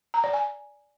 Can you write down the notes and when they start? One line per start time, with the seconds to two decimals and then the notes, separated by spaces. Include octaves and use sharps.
0.14 A#5
0.24 D5
0.33 G#5